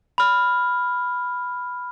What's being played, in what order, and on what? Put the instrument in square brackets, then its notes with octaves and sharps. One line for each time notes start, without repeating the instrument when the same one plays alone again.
[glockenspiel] B5 F6